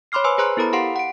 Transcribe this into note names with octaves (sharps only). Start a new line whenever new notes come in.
C#5 B5 C6 D6 F6 C7
B4 C5 G#5 C6 E6
G#4 B4 C5 A#5 C6 F#6
B3 E4 A4 A#4 A#5 B5
G4 F5 F#5 C6 C7 D7
F#5 D7